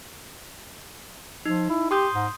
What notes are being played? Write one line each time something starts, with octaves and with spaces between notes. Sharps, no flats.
F3 D#4
E4
G4 C6 D#6 G6
G#2